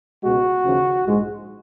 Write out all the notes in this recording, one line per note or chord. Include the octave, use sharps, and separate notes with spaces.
C#2 B2 G#3 F#4
D#2 C#3 F3
A#1 G#2 F3 G#3